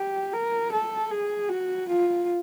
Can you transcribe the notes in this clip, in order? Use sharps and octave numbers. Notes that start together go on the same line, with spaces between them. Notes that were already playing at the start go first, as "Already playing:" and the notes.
Already playing: G4
A#4
A4
G#4
F#4
F4